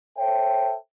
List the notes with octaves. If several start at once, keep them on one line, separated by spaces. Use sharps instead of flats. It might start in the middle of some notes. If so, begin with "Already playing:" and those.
A4 C5 C#5 E5 G5